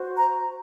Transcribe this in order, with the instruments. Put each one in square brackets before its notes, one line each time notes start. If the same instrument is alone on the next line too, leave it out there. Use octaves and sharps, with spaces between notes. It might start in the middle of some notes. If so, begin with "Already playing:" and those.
Already playing: [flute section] F#4 C5
A#5